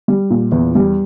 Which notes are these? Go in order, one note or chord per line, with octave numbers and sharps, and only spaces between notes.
G3
A#2
E2
G3